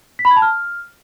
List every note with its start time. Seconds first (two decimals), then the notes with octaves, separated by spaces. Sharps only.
0.19 B6
0.25 B5
0.31 G#6
0.36 A5
0.42 F6